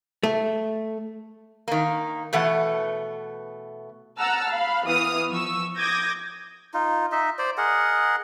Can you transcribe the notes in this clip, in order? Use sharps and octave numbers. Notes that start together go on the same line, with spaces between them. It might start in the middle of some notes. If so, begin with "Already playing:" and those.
A3
D#3 A#3
B2 E3 A3 F#5
F#5 A5 A#5 E6 F6
F5 B5
E3 B3 D#6 F6
F3 C#6 E6
D6 D#6 G6 G#6 A#6
D#4 F4
D#4 D#5 E5
C5 D5
G#4 A#4 D#5 F#5